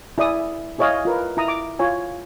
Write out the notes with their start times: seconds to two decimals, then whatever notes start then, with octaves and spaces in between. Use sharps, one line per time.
0.18 E4 G#4 D5 E5 D#6
0.79 E4 G#4 C#5 D#5 F5
1.05 F4 A#4 B4
1.37 E4 A#5 D#6
1.48 D6
1.79 F4 C#5 G#5